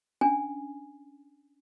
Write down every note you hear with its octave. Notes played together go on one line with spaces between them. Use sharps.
C#4 D4 G#5